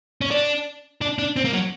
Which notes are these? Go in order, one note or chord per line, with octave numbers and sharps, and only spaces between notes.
C#4
D4
D4
D4
C4
A#3
F#3